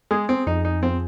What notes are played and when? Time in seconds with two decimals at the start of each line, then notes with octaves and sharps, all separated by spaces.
0.11 G#3 G#4
0.29 C4
0.47 F2 D#4
0.65 D#4
0.83 F3 C4